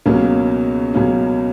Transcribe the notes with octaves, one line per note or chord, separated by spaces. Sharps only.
C#2 B2 F#3 A#3 C#4
C#2 B2 F#3 A#3 C#4